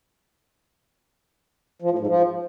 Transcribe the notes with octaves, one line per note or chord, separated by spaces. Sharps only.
F3
A2
G#2
F3